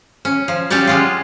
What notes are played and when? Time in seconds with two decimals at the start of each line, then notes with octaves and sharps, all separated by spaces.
0.25 C#4
0.48 F3
0.70 F#3 C#4 G4 C#5 D5
0.87 G#3 C#4 F4